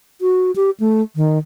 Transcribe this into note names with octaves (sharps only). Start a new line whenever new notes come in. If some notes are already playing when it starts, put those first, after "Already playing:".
F#4
G4
A3
D#3